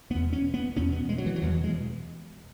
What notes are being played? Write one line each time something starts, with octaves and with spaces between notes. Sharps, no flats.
E2 B2 B3
C#4
B3
E2 B2 C#4
B3
G#3
F#3
E3
F#3
E2 B2 E3
G#3